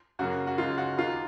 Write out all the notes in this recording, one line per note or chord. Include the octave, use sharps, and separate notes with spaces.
F#2 C#3 F#3 A#3 F#4
F#4
C#2 C#3 G#3 D#4 F4
F#4
D#2 D#3 A#3 D#4 F4